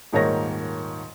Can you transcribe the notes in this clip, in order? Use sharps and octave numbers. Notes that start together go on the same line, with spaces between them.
D#1 G#2 D#3 A#3 C#5 A#6